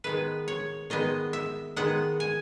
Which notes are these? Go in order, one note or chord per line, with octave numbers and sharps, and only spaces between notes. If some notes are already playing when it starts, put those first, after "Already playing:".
D#3 G#3 B3 B4
C#5
D#3 G#3 B3 D#5
E5
D#3 G#3 B3 F#5
G#5